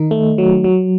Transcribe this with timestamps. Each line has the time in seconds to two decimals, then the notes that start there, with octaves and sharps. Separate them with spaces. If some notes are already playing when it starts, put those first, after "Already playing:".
Already playing: D#3 D#4
0.11 A3
0.38 F#3
0.64 F#3